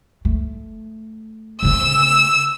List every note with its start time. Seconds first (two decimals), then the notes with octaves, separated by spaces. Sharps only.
0.25 A3
1.62 C#3 A3 E6